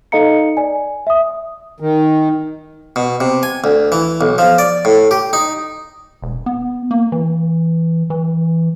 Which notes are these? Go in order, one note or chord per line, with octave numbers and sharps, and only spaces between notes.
D#4 A4 D#5 F5 A#5 C#7
D5 G#5
E5 D#6
D#3
B2
C3
G#5
D2
E3
B1
F3
D5
A2
G4
D#4
E1
B3
A#3
E3
E3